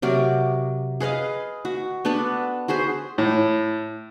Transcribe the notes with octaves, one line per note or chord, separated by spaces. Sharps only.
C3 F#3 A#4 D5
G#4 B4 D#5 F5
F#4
B3 D4 A4 B4
F#4 G#4 B4 C5
A2